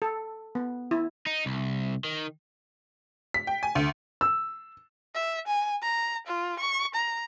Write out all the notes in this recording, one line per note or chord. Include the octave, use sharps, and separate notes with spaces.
A4
B3
E4
D#4
C2
D#3
B6
G5
G#5
D2
E6
E5
G#5
A#5
F4
C#6
A#5